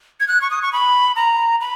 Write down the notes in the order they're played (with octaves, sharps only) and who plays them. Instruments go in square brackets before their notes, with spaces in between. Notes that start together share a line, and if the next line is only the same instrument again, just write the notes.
[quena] G#6
F#6
C#6
D#6
C#6
B5
A#5
B5